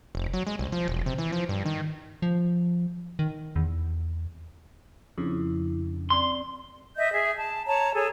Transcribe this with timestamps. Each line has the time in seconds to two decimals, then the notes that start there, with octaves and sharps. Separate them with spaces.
0.15 F1
0.34 F#3
0.47 G#3
0.59 C2
0.72 F3
0.88 E1
1.06 C3
1.18 E3
1.32 F3
1.49 G2
1.66 D#3
2.22 F3
3.19 D#3
3.56 E2
5.18 F2 C#3 D4 E4
6.10 C4 D5 C6
6.96 D#5 E5 G6
7.12 G#4 E5
7.37 A5
7.67 C#5 A5 A#5
7.95 G#4 A4 C#5